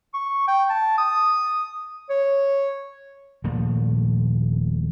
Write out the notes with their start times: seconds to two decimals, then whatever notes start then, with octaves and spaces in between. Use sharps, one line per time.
0.14 C#6
0.48 G5
0.70 A5
0.98 D#6
2.10 C#5
3.44 D#1 A#2 F3 A3